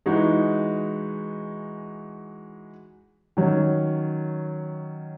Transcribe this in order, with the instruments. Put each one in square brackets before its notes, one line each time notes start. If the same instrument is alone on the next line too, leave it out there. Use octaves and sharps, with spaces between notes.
[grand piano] E3 G#3 D#4 F#4
D#3 F#3 C#4